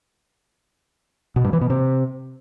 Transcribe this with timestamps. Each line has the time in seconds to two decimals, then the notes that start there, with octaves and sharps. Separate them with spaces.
1.36 B2
1.45 G2
1.53 E3
1.61 B2
1.70 C3